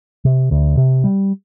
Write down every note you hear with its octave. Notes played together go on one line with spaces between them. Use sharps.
C3
D2
C3
G3